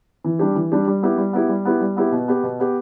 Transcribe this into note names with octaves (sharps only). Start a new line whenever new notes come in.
E3
G3 D4 G4
E3
G3 D4 G4
G3
B3 E4 G4
G3
B3 E4 G4
G3
B3 E4 G4
G3
B3 E4 G4
B2
B3 G4
B2
B3 G4